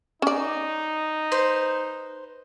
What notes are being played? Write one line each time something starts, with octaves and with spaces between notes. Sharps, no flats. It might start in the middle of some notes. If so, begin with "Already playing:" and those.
C#4 D#4 D5
B4 C5